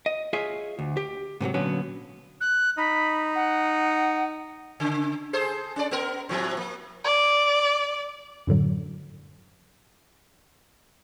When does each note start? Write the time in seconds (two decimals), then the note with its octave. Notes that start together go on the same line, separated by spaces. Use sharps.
0.06 D#5
0.33 F4 G#4 C#5 D#5 E5
0.79 D2
0.97 G4
1.40 G#2 C3 E3 F#3
1.54 A#2 D3 F#3 B3 C#4
2.40 F#6
2.78 D#4 B5
3.35 F#5
4.80 C#3
5.33 G#4 A4 C5
5.76 C#4 D5
5.91 B3 A#4
6.29 A2 F3 C4
6.57 A#3
7.04 D5
8.47 F#2 A2 D3 F#3